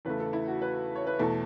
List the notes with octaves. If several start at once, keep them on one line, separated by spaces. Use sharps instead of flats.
E2 C#3 A3 B4
A4
E4
F#4
B4
C#5
B4
E2 B2 A3 A4